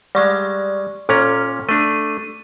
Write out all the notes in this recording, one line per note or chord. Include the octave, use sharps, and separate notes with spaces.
G3 G#3 D5 C#6
A#2 C#4 A4 A#5 F6
A3 D4 D#7